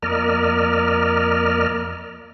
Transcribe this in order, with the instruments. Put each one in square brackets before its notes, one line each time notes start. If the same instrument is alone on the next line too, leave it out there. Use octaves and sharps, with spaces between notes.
[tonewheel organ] F2 A#3 A#4 D5 D#5 F6